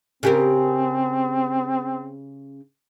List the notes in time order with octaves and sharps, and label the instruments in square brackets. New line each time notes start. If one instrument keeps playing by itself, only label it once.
[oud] C#3 G4 A#4 [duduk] C4